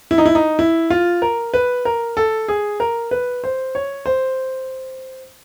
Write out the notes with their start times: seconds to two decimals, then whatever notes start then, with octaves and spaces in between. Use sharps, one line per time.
0.11 E4
0.18 D#4
0.26 E4
0.35 D#4
0.59 E4
0.90 F4
1.22 A#4
1.54 B4
1.85 A#4
2.17 A4
2.48 G#4
2.80 A#4
3.11 B4
3.44 C5
3.75 C#5
4.06 C5